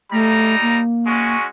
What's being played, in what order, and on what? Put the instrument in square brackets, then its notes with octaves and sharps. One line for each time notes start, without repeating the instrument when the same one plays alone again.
[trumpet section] G3 D#4 A#5 [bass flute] A3
[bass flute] A#3
[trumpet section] G#3 C#4 F#4